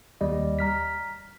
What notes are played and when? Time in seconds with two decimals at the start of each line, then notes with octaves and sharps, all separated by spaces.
0.21 D#2 G3 D#5
0.59 A#5 F6 B6